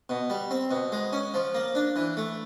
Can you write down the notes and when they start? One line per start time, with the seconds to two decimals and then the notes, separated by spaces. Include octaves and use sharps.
0.09 B2
0.30 G3
0.51 C4
0.71 B2
0.92 G#3
1.13 C#4
1.34 F3
1.55 A#3
1.75 D4
1.96 E3
2.17 A3